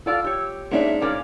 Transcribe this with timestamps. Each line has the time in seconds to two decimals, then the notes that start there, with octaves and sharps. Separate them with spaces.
0.06 F4 A4 D5 F5 E6
0.24 G4 C#5
0.72 G#2 A#3 C#4 D4 E5
1.01 A#2 A#3 C#4 D5 D6